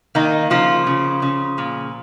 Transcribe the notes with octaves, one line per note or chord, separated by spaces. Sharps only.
D#3 A#3 D#4
C#3 F3 F4
C#3
C#3
A#2